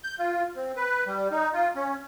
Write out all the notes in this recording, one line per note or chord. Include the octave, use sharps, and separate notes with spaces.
G6
F4
C4
B4
G3
D#4
F4
C#4